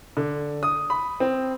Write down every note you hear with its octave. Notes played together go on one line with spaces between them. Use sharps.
D3
D#6
B5
C4